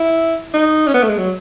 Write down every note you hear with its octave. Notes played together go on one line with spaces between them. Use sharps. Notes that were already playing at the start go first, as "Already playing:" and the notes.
Already playing: E4
D#4
C#4
B3
A3
G#3
F#3